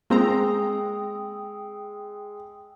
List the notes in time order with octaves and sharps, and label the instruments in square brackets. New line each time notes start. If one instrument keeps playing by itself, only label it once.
[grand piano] G#3 [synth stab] A#3 C4 A#5 [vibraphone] G5 D#6 E6